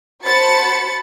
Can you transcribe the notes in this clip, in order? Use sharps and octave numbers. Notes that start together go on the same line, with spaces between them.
F#4 C5 A5 B5 A6 C#7